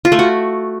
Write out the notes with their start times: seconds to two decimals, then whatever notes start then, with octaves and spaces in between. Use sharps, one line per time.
0.05 F4
0.12 A3
0.19 F#4